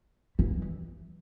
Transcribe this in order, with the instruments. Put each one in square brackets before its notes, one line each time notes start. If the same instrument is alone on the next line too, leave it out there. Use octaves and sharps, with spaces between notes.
[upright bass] E3